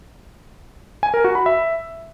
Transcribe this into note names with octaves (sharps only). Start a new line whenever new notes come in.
G#5
A#4
F#4
B5
E5